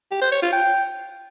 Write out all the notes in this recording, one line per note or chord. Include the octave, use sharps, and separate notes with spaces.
G4
C5
C#5
F4
G5